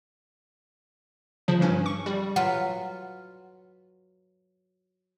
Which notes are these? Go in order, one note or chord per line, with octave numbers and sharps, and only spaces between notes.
C#3 F3
G2 C#4
C#6
G3
F#3 F4 B4 F#5